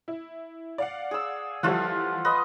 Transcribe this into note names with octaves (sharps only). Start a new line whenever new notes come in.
E4
D5 F5 F#5
G#4 E6
E3 F3 G3 A3 F4 F#5
B4 D#5